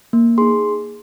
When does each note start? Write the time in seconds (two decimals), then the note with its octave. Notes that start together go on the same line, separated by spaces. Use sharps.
0.13 A#3
0.38 D#4 G#4 C6